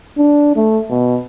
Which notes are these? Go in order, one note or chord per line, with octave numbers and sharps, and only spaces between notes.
D4
A3
B2